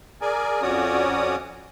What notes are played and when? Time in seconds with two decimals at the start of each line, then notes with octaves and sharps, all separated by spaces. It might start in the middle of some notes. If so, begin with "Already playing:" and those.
0.21 G#4 A#4 D5 G#5
0.62 F2 C#4 F#4 C#5 D5 D#6